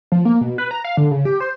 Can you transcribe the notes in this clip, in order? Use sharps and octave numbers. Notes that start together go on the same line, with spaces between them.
F3
A#3
B2
B4
A#5
F5
D3
C#3
G4
C5